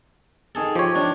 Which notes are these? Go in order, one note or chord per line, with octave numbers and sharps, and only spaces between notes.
D#3 G#4 A4
F3 G4 C#5
D#3 D4